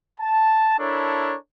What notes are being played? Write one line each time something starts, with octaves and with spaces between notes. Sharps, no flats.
A5
D4 E4 A4 A#4 C#5